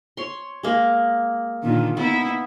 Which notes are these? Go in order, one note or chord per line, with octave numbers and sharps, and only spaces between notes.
C#5 C6
G#3 A#3
A#2 D3 D#3
A#3 B3 D#4 E4